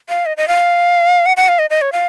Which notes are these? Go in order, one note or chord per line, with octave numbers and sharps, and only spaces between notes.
F5
D#5
D#5
F5
F#5
F#5
F5
D#5
D#5
C#5
F5